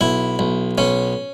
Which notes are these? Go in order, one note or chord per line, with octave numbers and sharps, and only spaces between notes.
B1 E4
B1
B1 C#4